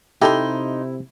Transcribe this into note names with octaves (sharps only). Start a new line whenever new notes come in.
C3 D#4 E4 G4 A4 C6